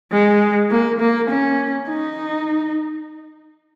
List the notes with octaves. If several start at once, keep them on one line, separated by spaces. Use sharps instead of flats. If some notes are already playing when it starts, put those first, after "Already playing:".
G#3
A#3
A#3
C#4
D#4